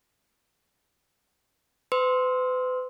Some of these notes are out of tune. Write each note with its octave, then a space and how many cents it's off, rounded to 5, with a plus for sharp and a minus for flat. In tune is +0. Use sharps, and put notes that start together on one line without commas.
B4 +45 C6 -5 E6 -35